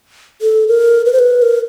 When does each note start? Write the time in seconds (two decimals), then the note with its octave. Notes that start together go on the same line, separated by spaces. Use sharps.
0.42 A4
0.68 A#4
1.05 B4
1.13 C5
1.19 B4
1.42 A#4